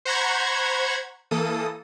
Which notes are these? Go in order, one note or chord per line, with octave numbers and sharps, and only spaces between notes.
C5 F#5 A#5 B5 C#6 G#6
E3 A#3 A4 D#6